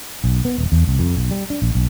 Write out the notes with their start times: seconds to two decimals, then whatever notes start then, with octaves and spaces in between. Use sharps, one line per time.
0.24 B1
0.45 B3
0.58 D#1
0.72 E2
0.87 C2
0.99 F2
1.17 B1
1.31 G3
1.50 D4
1.62 A#1
1.75 B1